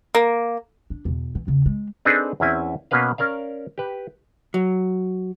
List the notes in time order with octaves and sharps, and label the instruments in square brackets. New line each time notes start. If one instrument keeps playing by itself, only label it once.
[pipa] A#3
[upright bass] D4
E2 B2
E3
E2 C#3
G#3
[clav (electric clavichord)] C4 D4 D#4 G#4 A4 B4
E2 C4 C#4 E4 G#5
B2 A#3 C#4 B4 F5
C#4 A#4 D5 F5
G4 B4
[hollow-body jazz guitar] F#3